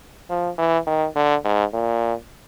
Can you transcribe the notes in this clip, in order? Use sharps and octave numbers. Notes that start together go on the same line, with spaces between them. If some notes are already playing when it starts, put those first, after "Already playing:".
F3
E3
D#3
D3
G#2
A#2